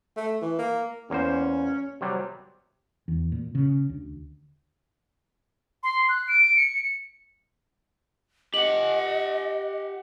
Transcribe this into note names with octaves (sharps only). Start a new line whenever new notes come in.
A3
E3
A#3
E2 A#3 C#4 C5
C3 F#3 G3
E2
A#2
C#3
D2
C6
F#6
D7
C#7
G4 D#5 F#5 F#7